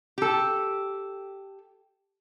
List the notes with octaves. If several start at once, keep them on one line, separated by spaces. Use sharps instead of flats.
G4 A4